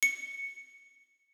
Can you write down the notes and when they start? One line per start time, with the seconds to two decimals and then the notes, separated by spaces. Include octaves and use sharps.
0.03 C#7